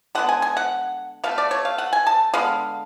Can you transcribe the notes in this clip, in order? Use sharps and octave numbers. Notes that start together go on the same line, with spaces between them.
D3 G#3 B3 F#5
G#5
G#5
F#5
B2 A3 F5
D5
C#5
F5
F#5
G#5
A5
D3 G#3 B3 F5